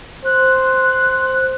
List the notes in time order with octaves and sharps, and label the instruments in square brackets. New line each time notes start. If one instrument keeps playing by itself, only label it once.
[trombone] C5 [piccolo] F#6